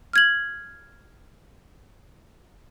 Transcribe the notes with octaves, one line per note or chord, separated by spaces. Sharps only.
F6 G#6 F#7